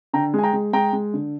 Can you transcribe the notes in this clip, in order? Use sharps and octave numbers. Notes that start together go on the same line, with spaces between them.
D3 G5 A#5
G#3 G#5
G5 A#5
G#3
G#3 G5 A#5
G#3
D3